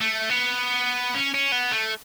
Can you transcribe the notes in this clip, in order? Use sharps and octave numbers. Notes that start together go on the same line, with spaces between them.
A3
B3
C#4
C#4
B3
A3